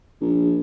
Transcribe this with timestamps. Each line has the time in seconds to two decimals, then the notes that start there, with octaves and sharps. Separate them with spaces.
0.21 A#1